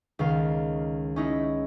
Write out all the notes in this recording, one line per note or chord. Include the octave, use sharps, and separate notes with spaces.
C#2 D#3 F5
C#4 D#4 E4